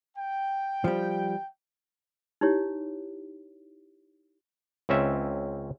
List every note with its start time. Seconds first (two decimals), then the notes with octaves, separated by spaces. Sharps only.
0.17 G5
0.84 F3 G3
2.41 D#4 E4 G4 C#5
4.89 C#2 C4 C#4 E5